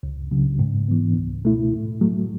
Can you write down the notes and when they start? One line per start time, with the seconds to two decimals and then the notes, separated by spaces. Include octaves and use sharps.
0.03 C#2
0.31 C#3 F#3
0.59 G#2
0.88 E3 B3
1.17 C#2
1.45 B2 A3 E4
1.73 A2
2.01 F#3 A3